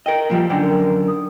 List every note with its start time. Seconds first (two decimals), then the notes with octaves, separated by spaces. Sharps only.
0.06 A#4 D#5 G5
0.30 A#2 F3 G3
0.50 F#2 D3 D#3 G5
0.62 A#4
1.08 D#6